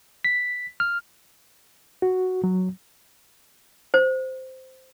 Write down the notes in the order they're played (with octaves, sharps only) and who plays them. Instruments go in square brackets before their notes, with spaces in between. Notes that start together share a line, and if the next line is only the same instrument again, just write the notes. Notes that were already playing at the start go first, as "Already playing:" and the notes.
[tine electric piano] B6
F6
[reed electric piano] F#4
F#3
[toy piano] C5